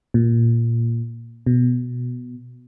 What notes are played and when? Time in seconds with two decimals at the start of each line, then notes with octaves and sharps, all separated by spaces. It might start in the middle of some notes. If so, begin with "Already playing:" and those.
0.14 A#2
1.46 B2